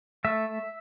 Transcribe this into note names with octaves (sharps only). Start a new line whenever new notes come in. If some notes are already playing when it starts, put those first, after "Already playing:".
A3 E5